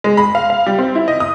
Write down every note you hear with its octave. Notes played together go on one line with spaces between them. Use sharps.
G#3
B5
F5
F5
G3
C4
E4
D#5
D#6